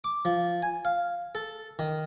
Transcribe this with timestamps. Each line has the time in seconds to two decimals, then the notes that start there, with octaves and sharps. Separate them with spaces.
0.04 D6
0.25 F3
0.63 G#5
0.85 F5
1.35 A4
1.79 D#3